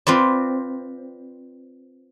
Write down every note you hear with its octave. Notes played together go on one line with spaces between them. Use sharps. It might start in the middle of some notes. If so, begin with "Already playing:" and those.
C4 F4 B4 D5